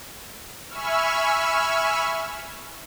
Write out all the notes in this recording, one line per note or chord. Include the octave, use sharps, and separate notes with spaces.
E5 G#5 B5 C#6 E6 F6